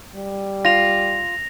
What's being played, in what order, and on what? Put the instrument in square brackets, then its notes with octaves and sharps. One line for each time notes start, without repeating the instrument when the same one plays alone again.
[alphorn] G3
[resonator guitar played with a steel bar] F4 [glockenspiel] A#6 F7